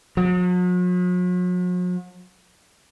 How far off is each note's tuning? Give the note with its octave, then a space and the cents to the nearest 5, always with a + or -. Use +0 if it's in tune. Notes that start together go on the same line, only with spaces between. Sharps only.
F#3 -45